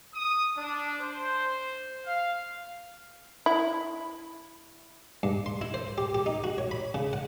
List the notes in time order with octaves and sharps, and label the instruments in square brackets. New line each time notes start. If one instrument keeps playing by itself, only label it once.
[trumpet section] D#6
D4
C5
F5
[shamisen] E4
[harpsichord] G2
C6
E4
C5
G4
G4
D#4
F#4
C#5
B5
C#3
F#5